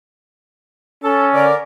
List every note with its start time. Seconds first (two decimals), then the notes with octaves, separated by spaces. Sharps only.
1.04 C#4 A4
1.34 D3 A#4 D5